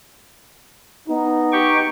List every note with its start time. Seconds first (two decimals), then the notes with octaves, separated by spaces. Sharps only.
1.08 B3 D#4
1.52 G4 G5 C#6